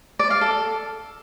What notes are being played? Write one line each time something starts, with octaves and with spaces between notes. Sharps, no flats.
D5
F5
A4